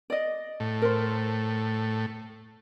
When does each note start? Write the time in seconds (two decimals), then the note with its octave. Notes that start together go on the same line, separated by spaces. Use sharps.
0.10 D5 D#5
0.60 A2
0.82 A#4 C5